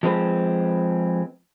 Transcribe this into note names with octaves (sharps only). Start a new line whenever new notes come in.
F3 G#3 C4 B4